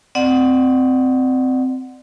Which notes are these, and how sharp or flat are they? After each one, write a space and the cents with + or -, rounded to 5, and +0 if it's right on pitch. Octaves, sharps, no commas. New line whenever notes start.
C4 -15 D5 +25 F#5 +0